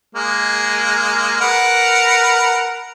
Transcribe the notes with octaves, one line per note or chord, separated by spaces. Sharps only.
G#3 A#3
A#4 B4 F#5